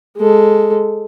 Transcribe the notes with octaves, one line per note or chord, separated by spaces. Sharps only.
G#3 A4